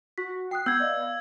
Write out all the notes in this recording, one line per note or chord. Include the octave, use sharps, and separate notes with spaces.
F#4 B6
G5 D#6 F#6 C7
B3 E6 G6 G#6
D5 D#5 F5
F5